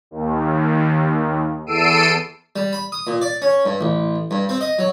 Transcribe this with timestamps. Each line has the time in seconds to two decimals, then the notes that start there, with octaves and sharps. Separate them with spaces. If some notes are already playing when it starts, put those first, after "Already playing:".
0.11 D#2
1.66 E2 A4 E6 C7 D7 D#7
2.56 G3
2.73 B5
2.92 D#6
3.07 A#2
3.22 D5
3.42 C#4
3.66 G2
3.81 A1
4.31 G2
4.49 C4
4.61 D#5
4.79 F#3